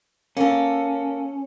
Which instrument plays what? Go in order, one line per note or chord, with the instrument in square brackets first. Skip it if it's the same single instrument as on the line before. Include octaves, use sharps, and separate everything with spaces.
[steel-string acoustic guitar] A#3 A4 [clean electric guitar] C#4